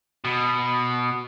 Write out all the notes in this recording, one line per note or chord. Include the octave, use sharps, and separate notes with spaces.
B2